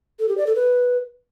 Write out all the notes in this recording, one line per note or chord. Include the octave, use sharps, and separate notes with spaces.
A4
G4
D5
A4
B4